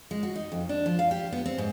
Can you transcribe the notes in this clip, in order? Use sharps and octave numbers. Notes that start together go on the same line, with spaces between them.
G#3
F#4
D#4
F2
D4
F3
F5
G4
B3
C4
G#2